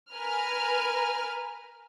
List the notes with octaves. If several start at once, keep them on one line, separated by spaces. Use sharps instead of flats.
A#4 B4 G#5 F6